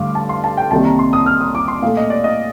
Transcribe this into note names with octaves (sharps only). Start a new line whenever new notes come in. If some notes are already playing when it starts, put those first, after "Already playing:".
Already playing: G2 D3 A3 F5 D6
A5
C6
A5
G5
C2 C3 D#3 G3 A#3 A5
A#5
C6
D#6
F6
D#6
D6
C6
A#2 A3 F5
D#5
D5
D#5